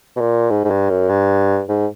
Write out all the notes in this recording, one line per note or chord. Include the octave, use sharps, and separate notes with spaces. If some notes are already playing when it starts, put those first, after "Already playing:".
B2
A#2
G#2
G#2
G2
F#2
G2
G#2